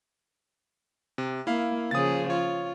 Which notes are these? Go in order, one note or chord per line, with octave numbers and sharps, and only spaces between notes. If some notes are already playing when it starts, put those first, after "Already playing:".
C3
A#3 E4 F5
C#3 F3 G#4 D#6 A6
F4 C#5